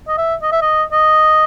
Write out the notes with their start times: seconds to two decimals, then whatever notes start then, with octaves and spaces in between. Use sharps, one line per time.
0.08 D#5
0.18 E5
0.42 D#5
0.52 E5
0.62 D#5
0.92 D#5